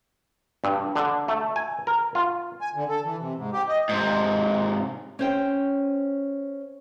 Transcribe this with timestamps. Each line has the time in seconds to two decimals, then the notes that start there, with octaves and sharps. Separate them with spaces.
0.64 G2
0.96 D3
1.28 A3
1.56 G#5
1.87 A#4
2.15 F4
2.60 G#5
2.75 D3
2.89 A4
3.04 E3
3.18 C3
3.37 G#2
3.53 G4
3.68 D#5
3.89 G#2 C3
5.19 C#4 C5 G5